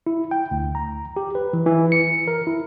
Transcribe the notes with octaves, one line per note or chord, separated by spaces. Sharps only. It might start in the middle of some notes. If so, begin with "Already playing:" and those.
E4
G5
D2
A#5
G4
B4
E3
E3
C#7
A#4
E4